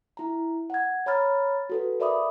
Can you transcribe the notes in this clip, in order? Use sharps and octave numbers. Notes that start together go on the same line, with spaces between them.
E4 A#5
F#5 G#6
C#5 A#5 B5 F6 A6
F#4 A4 B4
A#4 D5 E5 B5 D6 D#6